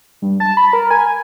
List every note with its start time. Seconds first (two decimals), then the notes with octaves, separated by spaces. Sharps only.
0.22 G2
0.40 A5
0.57 B5
0.73 A#4
0.91 G#5